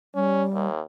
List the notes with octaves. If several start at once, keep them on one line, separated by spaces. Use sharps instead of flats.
G3 C#4
D#2